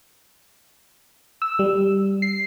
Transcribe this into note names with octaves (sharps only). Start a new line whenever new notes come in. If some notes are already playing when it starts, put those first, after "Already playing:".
E6
G3
C7